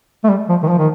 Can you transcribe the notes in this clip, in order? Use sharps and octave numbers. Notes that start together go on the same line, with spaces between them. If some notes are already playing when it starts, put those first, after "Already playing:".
A3
G3
F3
D#3
F3
D#3